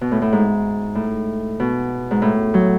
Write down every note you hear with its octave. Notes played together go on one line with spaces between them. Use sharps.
B2
A2
A2
G#2
A2
B2
G#2
A2
F#3